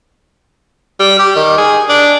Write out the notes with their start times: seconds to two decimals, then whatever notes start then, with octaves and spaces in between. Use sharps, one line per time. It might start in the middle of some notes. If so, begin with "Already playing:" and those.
0.99 G3
1.19 G4
1.36 D#3
1.58 G#4
1.89 D4